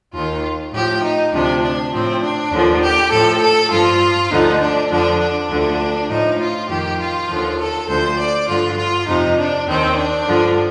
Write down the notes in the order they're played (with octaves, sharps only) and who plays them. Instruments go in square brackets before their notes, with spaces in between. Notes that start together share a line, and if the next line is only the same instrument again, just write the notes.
[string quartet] D#2 D#3 F4
A2 F3 G4
D#4
D2 C3 F3 D4
D4
A2 F3 C4
D4
D#2 D3 F3
G4
A2 F3 A4
A4
G2 F3 F4
D2 D3 F3 D#4
D4
F2 D3 F3 D4
D4
D2 D3 F3
A2 F3 D#4
F4
F2 D#3 G4
F4
D#2 D3 F3
A4
D2 D3 F3 C5
D5
G2 D3 F3 F4
F4
F2 C3 F3 D#4
D4
D#2 D#3 C4
D4
G2 D3 F3